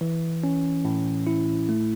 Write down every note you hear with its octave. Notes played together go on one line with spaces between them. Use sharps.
E3
C#4
A2
E4
A3